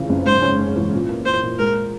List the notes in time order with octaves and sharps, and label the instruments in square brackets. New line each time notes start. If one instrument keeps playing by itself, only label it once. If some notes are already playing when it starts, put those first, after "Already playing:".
Already playing: [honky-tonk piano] F2 C#3 E3
F#1
[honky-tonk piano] G#2 [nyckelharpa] C5
[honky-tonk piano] C#4
G#3
E3
A#2
A#3
[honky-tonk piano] A#2 [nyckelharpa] C5
[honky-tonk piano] A#2
[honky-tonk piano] G#3 [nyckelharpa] A#4